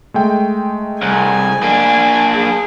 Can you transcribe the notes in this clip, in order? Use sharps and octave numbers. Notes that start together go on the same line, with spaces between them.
G#3 A3 G5
C2 G#5
A#3 D4
G#4